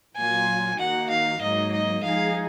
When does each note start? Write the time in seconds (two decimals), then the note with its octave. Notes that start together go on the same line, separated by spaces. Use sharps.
0.16 A#2 F#3 A#3 F4 G#5
0.79 D#3 A#3 D#4 F#4 F#5
1.10 F5
1.41 G#2 F#3 A#3 D#4 D#5
1.72 D#5
2.03 F3 G#3 D#4 G#4 F5